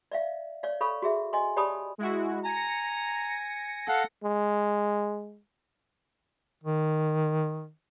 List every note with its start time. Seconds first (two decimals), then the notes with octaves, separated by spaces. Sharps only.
0.12 D5 E5 F5
0.63 C#5 D5 F5
0.81 A4 C#5 F5 B5 C#6
1.02 F#4 G#4 E5
1.33 D#5 G#5 C6
1.57 G4 C#5 D5 A5 B5 D#6
1.98 G#3 E4 F#4
2.45 G#5 A#5 A#6 C#7
3.88 A4 F5 F#5
4.23 G#3
6.63 D#3